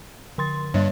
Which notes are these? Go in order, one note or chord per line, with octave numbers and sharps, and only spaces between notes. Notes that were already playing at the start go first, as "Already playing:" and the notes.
D3 C6 A6
G2 G3 C#5